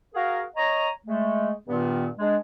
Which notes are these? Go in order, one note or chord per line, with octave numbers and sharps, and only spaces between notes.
F#4 G#4 A#4 F5
C#5 D#5 A#5
G#3 A3
G2 A#2 D#3 B3
G#3 D4